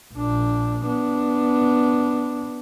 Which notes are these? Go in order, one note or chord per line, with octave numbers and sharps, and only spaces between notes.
A#1 D4
B3 D4